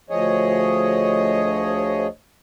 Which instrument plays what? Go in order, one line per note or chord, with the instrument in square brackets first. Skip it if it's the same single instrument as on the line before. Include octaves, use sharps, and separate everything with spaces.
[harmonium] D2 F3 G#4 C#5 D#5